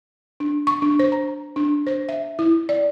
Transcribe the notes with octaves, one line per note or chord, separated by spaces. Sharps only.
D4
C#6
D4
C5
A#5
D4
C5
E5
E4
D5